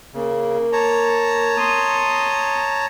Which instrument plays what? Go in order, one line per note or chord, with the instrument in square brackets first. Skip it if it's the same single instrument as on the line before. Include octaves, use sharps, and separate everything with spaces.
[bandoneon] C#3 [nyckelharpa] A#3
[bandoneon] C#5 A5 A#5
[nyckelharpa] C6 D#6